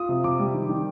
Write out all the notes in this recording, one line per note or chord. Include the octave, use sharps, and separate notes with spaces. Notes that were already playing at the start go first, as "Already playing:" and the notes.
Already playing: F4 D#6
C3
C3 D6
G3
D#3
D#3